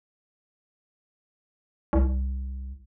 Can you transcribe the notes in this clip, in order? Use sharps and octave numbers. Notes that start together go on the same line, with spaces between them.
C2